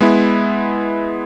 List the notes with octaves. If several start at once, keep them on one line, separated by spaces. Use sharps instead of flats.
G#3 B3 E4